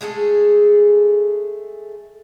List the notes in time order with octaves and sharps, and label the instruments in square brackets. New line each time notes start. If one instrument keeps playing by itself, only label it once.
[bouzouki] G#3 A3 G#4 A4